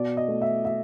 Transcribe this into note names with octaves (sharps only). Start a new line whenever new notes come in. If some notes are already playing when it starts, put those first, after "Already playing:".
Already playing: B2 D5
D#5
A3
E5
E5